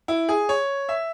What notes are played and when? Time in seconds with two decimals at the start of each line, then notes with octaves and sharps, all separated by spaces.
0.08 E4
0.29 G#4
0.49 C#5
0.89 E5